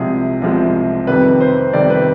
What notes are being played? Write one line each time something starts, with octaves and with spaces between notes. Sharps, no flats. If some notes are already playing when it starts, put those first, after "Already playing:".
Already playing: C2 C3 F3 G#3 G#4
C2 C3 F3 G#3
F2 C3 D#3 G3 B4
C5
F2 C3 D#3 G3 D5
B4